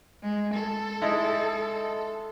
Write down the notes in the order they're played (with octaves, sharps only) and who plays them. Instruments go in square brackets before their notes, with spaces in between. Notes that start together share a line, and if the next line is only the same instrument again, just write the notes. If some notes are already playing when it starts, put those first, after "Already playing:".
[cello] G#3
A4
[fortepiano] G#3 D#4 E4